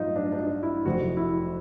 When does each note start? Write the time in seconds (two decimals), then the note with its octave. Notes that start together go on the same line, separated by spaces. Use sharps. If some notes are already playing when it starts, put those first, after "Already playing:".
Already playing: A1 G2 F#3 D#4 F4
0.16 D4
0.32 D4
0.39 D#4
0.63 E4
0.85 F1 F2 C3 F#4
1.17 E4